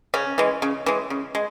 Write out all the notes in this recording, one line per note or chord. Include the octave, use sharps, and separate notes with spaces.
C#3 C#4
E3 G#3
C#3
E3 G#3
C#3
G#3